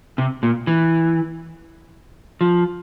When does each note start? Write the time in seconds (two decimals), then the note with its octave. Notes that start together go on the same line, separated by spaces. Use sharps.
0.18 C3
0.43 A#2
0.67 E3
2.41 F3